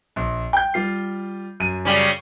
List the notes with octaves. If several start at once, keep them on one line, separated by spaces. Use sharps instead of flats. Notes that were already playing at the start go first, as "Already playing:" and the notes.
A#1
G5 G6
G3 F4 C7
F#2 D#7
C#3 G3 C#4